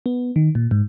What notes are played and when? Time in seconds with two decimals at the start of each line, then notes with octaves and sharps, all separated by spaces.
0.06 B3
0.36 D#3
0.55 A#2
0.71 G#2